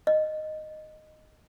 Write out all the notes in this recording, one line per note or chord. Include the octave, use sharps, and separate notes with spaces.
D#5